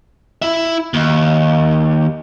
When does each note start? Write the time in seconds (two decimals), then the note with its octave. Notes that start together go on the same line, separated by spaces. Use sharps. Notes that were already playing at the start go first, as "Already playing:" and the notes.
0.42 E4 E5
0.94 D#2